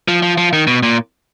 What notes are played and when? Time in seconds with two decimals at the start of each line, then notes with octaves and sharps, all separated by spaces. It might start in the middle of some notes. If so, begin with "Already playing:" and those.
0.08 F3
0.22 F3
0.38 F3
0.53 D#3
0.67 B2
0.83 A#2